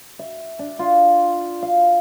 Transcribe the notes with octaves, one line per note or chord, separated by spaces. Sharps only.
E5
D4
F4
F5